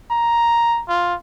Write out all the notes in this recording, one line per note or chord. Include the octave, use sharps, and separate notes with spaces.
A#5
F4